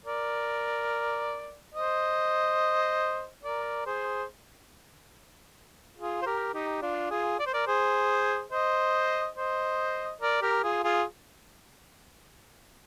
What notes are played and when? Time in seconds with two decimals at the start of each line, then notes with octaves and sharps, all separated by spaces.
0.05 A#4 D5
1.74 C5 D#5
3.43 A#4 D5
3.86 G#4 C5
5.98 F4 G#4
6.22 C5
6.26 G4 A#4
6.53 D#4 G4
6.82 D4 F4
7.10 F4 G#4
7.39 D5
7.46 C5
7.53 A#4 D5
7.66 G#4 C5
8.52 C5 D#5
9.36 C5 D#5
10.21 A#4 D5
10.41 G4 A#4
10.63 F4 G#4
10.84 F4 G#4